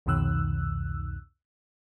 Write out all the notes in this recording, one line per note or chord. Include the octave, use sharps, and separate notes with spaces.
C2 F2 B2 D#3 E6 F#6